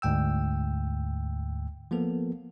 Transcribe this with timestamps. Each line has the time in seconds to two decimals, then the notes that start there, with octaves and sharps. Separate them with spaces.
0.02 D2 G#2 G5 E6
1.91 F3 A#3 B3 A4